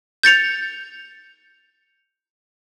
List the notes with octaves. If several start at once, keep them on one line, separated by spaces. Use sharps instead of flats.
G6 A6 C#7 F7